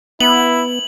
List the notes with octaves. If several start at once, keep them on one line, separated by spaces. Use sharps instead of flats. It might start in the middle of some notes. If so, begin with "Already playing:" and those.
B3 E4 F#7